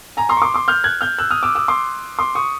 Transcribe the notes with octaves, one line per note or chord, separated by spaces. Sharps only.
G#5 A#5
A#5 C6
C#6
C6 D6
C6 D6
F6 G6
F#6 G#6
F6 G6
E6 F#6
D#6 F6
D6 E6
D6 E6
C6 D6
C6 D6
C#6 D#6